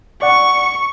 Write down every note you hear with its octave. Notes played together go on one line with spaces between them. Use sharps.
D5 F#5 C#6